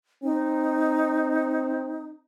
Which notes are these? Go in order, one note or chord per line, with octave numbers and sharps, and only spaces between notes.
C4 D#4